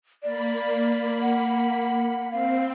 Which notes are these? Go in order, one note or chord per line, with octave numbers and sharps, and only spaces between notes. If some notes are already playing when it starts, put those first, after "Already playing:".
A#3 D5 B5
F#5
C4 F5